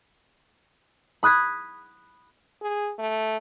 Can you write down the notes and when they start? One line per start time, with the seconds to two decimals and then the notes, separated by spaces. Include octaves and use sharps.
1.23 B5 D#6 F#6 G#6 B6
2.62 G#4
2.99 A3